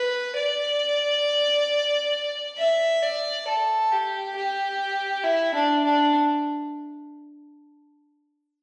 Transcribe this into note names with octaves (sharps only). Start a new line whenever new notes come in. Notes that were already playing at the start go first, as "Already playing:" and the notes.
Already playing: B4
D5
E5
D5
A4
G4
G4
E4
D4
D4